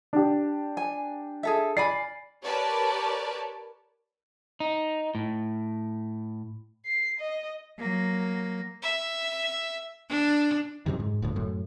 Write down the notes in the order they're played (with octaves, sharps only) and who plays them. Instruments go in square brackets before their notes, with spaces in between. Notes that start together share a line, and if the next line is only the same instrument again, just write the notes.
[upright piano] D4 G4
[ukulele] G#5
G#4 A4 E5
[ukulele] D5 G#5 B5 [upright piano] C7
[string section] G4 A#4 B4 C#5 D5 A5
[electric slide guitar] D#4
A2
[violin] C7
D#5
[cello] F#3 A#3
[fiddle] E5
[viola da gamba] D4
[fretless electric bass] F#2 A2 C3 D#3
G#2
D#1 D2 A2
F#2 A2